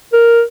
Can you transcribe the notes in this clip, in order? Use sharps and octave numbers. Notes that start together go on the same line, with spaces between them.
A#4